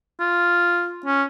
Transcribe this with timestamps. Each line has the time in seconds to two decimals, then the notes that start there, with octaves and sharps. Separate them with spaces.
0.20 F4
1.06 C#4